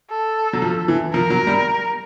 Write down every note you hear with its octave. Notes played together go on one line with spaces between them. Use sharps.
A4
F#3
F3
E3
F3 A#4
F#3
G3